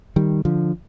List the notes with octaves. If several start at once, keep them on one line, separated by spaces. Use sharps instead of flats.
D#3 G3
D3 F3